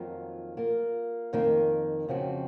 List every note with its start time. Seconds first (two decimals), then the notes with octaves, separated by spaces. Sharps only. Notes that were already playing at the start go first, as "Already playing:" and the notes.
Already playing: F2 D#3 F#3 A#3 F4
0.57 A#3 F4 A#4
1.33 F2 D#3 A#3
2.08 F2 C#3 F3 C4 F#4